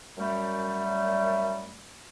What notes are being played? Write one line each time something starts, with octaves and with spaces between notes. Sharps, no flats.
F#2 G3 A3